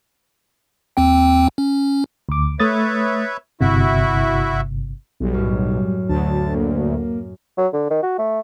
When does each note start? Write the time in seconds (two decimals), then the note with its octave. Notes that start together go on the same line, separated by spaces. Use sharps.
0.97 D#2 C4 G5
1.58 C#4
2.29 D2 D6
2.60 A3 B4 C#5 E5 D#6 A6
3.61 G1 C3 E4 F#4 E5
5.20 B1 G3
5.34 F#2 A2
6.09 D2 A5
6.55 A#3
7.58 F#3
7.73 D3
7.90 D#3
8.03 F#4
8.19 A3